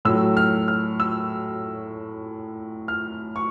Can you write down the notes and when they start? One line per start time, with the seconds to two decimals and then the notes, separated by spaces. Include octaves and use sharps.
0.05 A2 F#3 E6
0.37 F6
0.68 F6
1.00 E6
2.88 F6
3.36 C#6